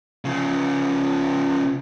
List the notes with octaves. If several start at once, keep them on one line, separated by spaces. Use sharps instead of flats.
C#3 F3